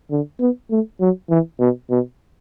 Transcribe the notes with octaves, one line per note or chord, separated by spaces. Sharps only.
D3
B3
A3
F#3
E3
B2
B2